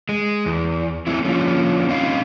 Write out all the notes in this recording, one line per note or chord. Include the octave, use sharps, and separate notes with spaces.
G#3
E2
A3 C4 E4
D3 F3 A#3 C#4 F4
C4 C#4 D#4 D#5 F5